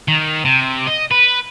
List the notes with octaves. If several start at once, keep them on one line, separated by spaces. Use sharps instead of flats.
D#3
C3
D#5
B4